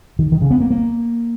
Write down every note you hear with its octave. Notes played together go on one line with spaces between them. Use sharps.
D#3
D#3
C#3
B3
A#3
A#3